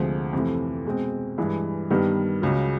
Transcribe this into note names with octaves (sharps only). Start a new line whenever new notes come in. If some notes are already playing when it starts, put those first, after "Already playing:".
Already playing: D2 C3 F3 G#3
F2 C3 E3 A3
B2 G#3 C4
G2 E3 G#3
G2 D#3 G3 B3
C#2 C#3 F#3